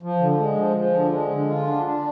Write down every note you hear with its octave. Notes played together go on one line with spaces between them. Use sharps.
F3
D3
G#3
F3
F3
D3
G#3
D3
F4
D4
D4